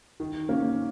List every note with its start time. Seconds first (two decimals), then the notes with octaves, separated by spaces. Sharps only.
0.20 D#3
0.49 A#3 C#4